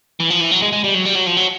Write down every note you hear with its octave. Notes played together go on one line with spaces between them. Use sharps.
E3
F3
E3
F#3
G#3
G#3
G3
F#3
G3
F#3
F3
F#3